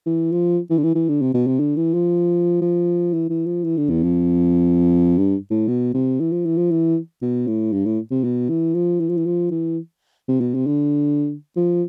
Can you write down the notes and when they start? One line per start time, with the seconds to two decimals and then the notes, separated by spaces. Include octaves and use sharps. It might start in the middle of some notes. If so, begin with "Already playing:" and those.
0.06 E3
0.32 F3
0.70 E3
0.78 D3
0.84 E3
0.95 E3
1.09 D3
1.22 C3
1.34 B2
1.47 C3
1.60 D3
1.77 E3
1.94 F3
2.62 F3
3.13 E3
3.30 E3
3.46 F3
3.64 E3
3.77 D3
3.90 E2
4.03 F2
5.18 G2
5.51 A2
5.68 B2
5.94 C3
6.20 E3
6.32 F3
6.46 E3
6.57 F3
6.71 E3
7.22 B2
7.48 A2
7.73 G2
7.86 A2
8.11 C3
8.24 B2
8.49 E3
8.75 F3
9.00 E3
9.09 F3
9.17 E3
9.26 F3
9.51 E3
10.29 C3
10.41 B2
10.55 C3
10.67 D3
11.56 F3